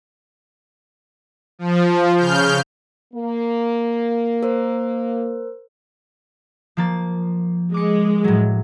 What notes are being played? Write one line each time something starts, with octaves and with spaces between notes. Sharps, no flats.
F3
C#3 F6 G6
A#3
A#4 C5
F3 A#3 A6
G#3 D6 C#7
A2 F#3